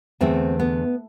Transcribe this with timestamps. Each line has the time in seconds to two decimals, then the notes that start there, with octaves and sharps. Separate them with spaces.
0.21 E2 D3 A3 C4
0.60 B3